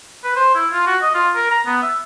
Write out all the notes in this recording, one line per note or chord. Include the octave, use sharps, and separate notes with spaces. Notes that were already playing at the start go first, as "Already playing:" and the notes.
B4
C5
E4
F4
F#4
D#5
F4
A#4
A#5
B3
E5